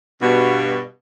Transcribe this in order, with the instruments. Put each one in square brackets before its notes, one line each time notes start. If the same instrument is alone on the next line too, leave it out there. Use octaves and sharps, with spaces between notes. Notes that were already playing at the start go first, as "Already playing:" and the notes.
[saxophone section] G2 B2